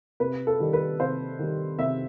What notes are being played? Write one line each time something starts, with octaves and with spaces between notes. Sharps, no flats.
C3 B4
A4
D#3 G3
B4
C3 C5
D#3 G3
C3 E5